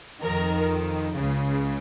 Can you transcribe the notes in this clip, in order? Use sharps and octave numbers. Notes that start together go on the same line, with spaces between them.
F2 D#3 A#4
C#2 C#3